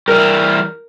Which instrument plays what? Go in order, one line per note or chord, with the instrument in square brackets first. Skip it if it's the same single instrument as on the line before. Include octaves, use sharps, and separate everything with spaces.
[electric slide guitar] E3 G3 [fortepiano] A#4